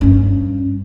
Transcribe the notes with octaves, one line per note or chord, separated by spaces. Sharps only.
G2 C#4